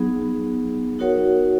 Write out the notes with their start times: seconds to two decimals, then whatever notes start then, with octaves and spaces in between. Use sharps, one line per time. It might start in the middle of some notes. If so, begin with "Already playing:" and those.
Already playing: F#3 B3 D#4 G#4
0.99 D#4 F#4 A#4 C#5 F#5